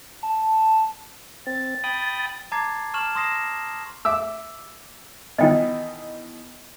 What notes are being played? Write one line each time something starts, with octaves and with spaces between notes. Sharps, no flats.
A5
C4 A6
G5 B5 D#6
A5 A#5 D6 G#6 A6 C7
A5 C#6 F6 E7 F#7
C6 D#6 A#6 C7 E7
E5 D6 E6
B2 D#3 E3 D#5 G5